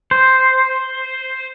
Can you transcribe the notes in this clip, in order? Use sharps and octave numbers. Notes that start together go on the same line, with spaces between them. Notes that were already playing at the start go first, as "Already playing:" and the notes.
C5